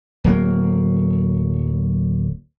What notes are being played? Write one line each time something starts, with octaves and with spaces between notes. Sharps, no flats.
D1 F#3 A#3